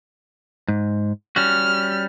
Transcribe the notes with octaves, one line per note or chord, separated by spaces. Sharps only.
G#2
G3 C#4 F#4 F6